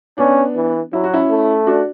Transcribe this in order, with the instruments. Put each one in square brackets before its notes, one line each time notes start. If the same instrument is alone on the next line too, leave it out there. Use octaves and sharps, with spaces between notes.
[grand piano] B3 D4 [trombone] C#4
[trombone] E3
[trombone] F#3 [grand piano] E4
[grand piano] F#4
C#4 E4
[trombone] A3
[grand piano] D4 F#4